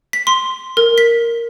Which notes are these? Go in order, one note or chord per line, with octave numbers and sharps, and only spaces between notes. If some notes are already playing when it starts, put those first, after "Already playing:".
B6
C6
A#4
B6